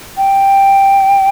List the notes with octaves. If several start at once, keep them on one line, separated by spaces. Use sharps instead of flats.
G5